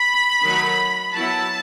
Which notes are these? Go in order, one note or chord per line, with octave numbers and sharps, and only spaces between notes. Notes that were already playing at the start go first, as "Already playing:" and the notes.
Already playing: B5
D#3 F#3 A3 D#4
F#3 B3 E4 A5